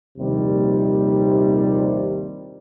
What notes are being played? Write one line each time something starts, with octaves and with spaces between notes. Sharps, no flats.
A#1 D#2 C3 D#3 F3 G3